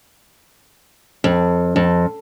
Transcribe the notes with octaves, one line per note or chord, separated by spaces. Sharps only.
F2
F2